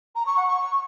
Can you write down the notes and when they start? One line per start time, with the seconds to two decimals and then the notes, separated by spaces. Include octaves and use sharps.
0.15 A#5
0.26 C#6
0.37 F#5
0.47 C#6